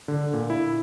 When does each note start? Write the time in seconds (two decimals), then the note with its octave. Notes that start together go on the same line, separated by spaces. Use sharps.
0.08 D3
0.33 A#2
0.50 E4